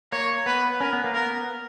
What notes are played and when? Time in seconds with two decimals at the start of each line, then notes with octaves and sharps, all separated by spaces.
0.12 A#3 C#5
0.46 B3 B4
0.80 C#4 A#4
0.93 B3
1.04 A#3
1.14 B3 A#4